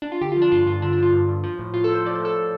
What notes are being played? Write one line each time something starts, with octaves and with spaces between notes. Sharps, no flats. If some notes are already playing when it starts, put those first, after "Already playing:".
D4
F4
D3 G4
F4
F3
D4
G2 F4
G2 F4
D3 D4
D4
F3 F4
G2
G2
F3
A2
A2 F4
A4
F3
C5
F3 D5
C5
A2
A4
A2